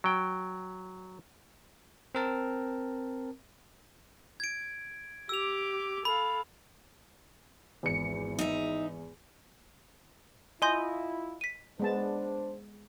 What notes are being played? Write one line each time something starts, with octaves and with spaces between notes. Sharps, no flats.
F#3 G5
C4 A#4 A5
G#6 D7
G4 D6 E6 F7
A4 F5 B5
G#1 E2 C#7
D#4 E5
E4 F4 D#5 G#5 C6 G6
B6 D#7
G#3 B3 D4 C5 A5